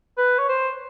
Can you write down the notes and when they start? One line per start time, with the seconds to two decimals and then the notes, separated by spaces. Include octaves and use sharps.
0.17 B4
0.39 C#5
0.49 C5